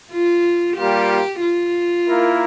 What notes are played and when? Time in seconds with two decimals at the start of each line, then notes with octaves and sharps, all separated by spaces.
0.12 F4
0.77 G3 A#3 F4 G4
1.41 F4
2.07 A#3 E4 A#4